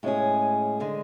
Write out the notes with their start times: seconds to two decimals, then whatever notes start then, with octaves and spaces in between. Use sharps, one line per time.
0.03 A2 G#3 C#4 G#4
0.80 D3 G#3